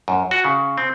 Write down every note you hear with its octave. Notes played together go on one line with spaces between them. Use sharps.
F#2
F#4
C#3
C4